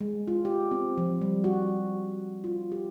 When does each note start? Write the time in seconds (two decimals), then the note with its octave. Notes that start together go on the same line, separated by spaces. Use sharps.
0.01 G#3
0.28 F4
0.45 G4
0.71 C4
0.98 F3
1.21 G3
1.44 F#4
2.44 F4
2.72 G4